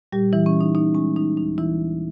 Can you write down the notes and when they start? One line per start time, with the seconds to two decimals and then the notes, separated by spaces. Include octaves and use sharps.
0.12 A#2 G3 G4
0.33 A#2 E3 E4
0.46 C#4
0.54 A#2
0.61 D#4
0.75 B3 D#4
0.95 G#3 C#4
1.16 G#3 D#4
1.37 D#2 D#4
1.58 E3 A#3 E4